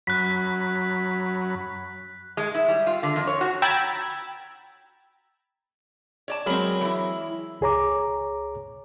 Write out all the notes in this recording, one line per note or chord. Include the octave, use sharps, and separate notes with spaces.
F#2 F#3 B5 F#6 B6
G#3
E4
G3
F4
D3
F2
C#5
F#4
G5 A#5 B5 E6 G#6 A6
C#5 D5 A5
F#3 G#3 C4 A#4 B5
E3 E4
C#2 G#4 C#5 A#5 D6